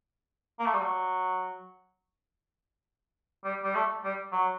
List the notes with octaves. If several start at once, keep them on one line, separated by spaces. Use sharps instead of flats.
A#3
A3
G3
F#3
G3
G3
A3
G3
F#3